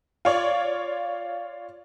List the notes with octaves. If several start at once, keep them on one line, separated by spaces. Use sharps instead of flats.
F4 C#5 D5